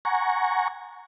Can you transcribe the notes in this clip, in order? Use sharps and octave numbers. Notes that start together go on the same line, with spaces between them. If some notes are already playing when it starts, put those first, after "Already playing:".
F#5 G#5 A#5 C#6